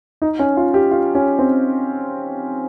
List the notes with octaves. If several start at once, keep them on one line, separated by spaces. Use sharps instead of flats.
D#4
C#4
F4
G4
F4
C#4
C4